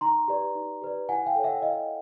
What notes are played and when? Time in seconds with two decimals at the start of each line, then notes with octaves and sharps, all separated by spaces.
0.01 D#4 A#5 C6
0.28 G4 B4 D5
0.55 D#4
0.82 G4 B4 D5
1.09 E4 F#5 G#5
1.26 F5 G5
1.35 A4 C#5
1.44 E5 F#5
1.62 E4 D#5 F5